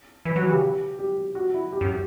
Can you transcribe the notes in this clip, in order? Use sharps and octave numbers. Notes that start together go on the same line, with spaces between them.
E3 B4
F#3 F#4
E3
C#3 G4
G4
F#4
E4
G4
F#2
G4